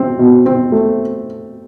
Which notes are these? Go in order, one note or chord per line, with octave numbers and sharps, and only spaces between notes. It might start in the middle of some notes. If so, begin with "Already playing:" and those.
Already playing: C4
B2
C4
A3